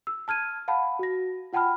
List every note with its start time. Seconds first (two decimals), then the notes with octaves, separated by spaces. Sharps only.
0.07 E6
0.28 A5 F6 G#6 D#7
0.68 F5 F#5 A5 B5
0.99 F#4 A#6
1.53 F4 F#5 G5 A5 B5 F6